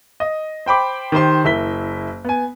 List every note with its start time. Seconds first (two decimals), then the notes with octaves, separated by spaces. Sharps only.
0.20 D#5
0.66 C5 G5 B5 D6
1.12 D#3 G4 C5 C6
1.44 F#1 E4 A#4 B6 G7
2.25 B3 G#5